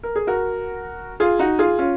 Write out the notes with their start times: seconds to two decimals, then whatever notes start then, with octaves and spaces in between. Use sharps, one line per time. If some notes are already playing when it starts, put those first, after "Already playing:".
0.03 A#4
0.16 G#4
0.27 F#4 A#4
1.20 F4 G#4
1.39 D#4 F#4
1.59 F4 G#4
1.79 C#4 F4